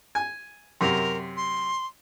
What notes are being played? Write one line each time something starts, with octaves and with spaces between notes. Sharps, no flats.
G#5
F#2 C3 A#4
C6